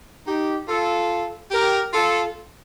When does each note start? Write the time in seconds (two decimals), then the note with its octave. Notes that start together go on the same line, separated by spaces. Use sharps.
0.27 D#4 G4
0.68 F4 A4
1.51 G4 A#4
1.93 F4 A4